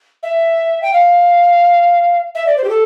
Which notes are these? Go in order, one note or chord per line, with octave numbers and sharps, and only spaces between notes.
E5
G5
F5
E5
D5
C5
G4
A4